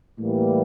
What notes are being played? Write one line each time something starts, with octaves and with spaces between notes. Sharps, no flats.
A2 E3 G3 A#3